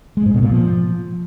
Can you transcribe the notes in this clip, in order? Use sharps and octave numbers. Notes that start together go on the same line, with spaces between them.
G#3
G#2
B2
A#2
F3